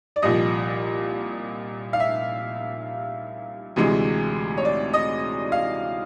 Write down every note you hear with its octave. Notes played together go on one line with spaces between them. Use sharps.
D5
C2 A#2 F3 D#5
F5
E5
D2 C3 E3 G#3
C#5
D5
D#5
F5